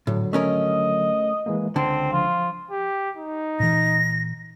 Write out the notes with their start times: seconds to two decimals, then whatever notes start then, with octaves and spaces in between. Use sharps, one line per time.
0.07 A2 D3 F#3
0.33 A3 C#4 A#4 D#5
1.46 E3 G#3 A#3
1.76 C#2 D3 C4 A5
2.13 F3 F4
2.71 G4
3.17 D#4
3.60 A#2 E3 A#6